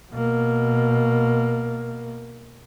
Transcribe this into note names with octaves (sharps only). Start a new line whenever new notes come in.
B2 A#3